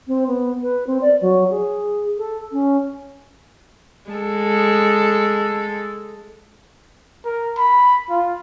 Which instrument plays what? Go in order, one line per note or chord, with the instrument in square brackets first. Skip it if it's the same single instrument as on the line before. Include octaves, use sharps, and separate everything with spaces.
[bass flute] C4
B3
B4
C4
D5
F#3
G#4
A4
C#4
[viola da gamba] G#3 A4
[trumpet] A#4
B5
F4